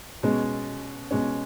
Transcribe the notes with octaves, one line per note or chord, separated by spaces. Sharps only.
B2 G#3 C#4
B2 G#3 C#4